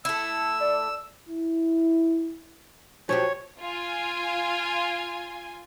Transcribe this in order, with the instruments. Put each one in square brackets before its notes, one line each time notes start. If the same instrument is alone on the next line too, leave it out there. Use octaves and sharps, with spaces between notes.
[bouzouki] A3 E4 [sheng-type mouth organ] E6
[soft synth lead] D5
[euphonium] E4
[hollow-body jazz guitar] F3 F#3 G4 [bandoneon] C#5
[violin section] F4 G#5